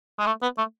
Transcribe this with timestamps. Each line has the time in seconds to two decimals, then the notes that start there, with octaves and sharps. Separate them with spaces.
0.19 G#3
0.27 A3
0.43 B3
0.58 A3